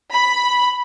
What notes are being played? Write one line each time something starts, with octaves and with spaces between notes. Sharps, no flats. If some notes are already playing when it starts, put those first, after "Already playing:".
B5